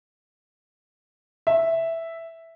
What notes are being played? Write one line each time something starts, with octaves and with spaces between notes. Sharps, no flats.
E5